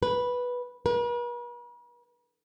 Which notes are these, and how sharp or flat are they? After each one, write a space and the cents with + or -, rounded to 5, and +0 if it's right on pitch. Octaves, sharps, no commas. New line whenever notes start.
B4 -10
B4 -45